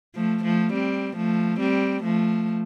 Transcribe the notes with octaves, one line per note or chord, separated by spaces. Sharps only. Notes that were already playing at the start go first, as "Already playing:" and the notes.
F3 A3
F3 A3
G3 C4
F3 A3
G3 C4
F3 A3